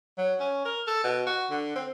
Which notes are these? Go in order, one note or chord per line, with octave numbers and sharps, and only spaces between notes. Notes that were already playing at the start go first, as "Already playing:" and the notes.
F#3
C#4
A#4
A4
B2
F#4
D3
C4